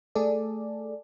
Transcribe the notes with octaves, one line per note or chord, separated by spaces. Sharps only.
A3 G#4 A4 D5